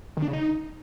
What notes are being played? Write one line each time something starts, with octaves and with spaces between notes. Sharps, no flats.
D#3
D4
C#3
D#4